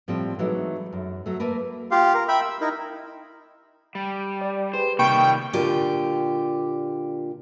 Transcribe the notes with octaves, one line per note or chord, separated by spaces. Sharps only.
A2 F3 G3 C4
E3 F#3 G#3 A3 D#4
F#2
F#3 A3
A3 A#3 A#4 B4
F4 G4 F5
A#4
E5 G5 B5
E6
D#4 E4 A#4
G3
D5
G4 G#4 B4 C5
C3 D#3 G3 A#3 G5 B5 C#6
A#2 D3 F4 G4